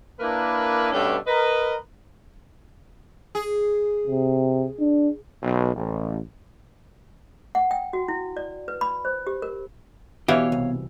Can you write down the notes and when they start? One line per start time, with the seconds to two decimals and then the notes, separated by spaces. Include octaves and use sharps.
0.20 A#3 D4 E4 A#4 B4
0.92 G2 B2 A3 C#4 D4 G4
1.27 A#4 B4 D#5
3.35 G#4
4.08 C3
4.80 D4
5.43 B1
5.75 A1
7.55 F#5
7.71 G5
7.93 F#4
8.08 E4
8.37 D5
8.68 B4
8.81 B5
9.05 C5
9.27 G4
9.42 A#4
10.28 B2 E3 B3 G4 C#5 F5
10.52 C2